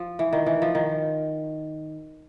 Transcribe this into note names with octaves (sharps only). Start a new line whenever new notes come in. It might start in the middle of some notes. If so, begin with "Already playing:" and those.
Already playing: F3
E3
D#3
E3
F3
D#3